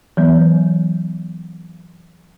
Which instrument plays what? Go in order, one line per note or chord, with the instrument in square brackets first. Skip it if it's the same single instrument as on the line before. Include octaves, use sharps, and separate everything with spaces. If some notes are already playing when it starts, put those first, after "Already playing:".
[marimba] E3 F#3 B3